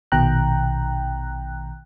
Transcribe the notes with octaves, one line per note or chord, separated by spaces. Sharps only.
A#1 B2 D#3 G5 A#5 F#6